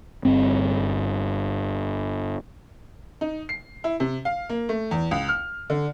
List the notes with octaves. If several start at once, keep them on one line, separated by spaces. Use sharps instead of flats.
G1 G2 C4
D#4
C7
E4
C3
F5
A#3
A3
E2
C#2
F6
D3